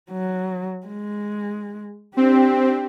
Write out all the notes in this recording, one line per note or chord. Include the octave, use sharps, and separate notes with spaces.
F#3
G#3
C4 D4 G4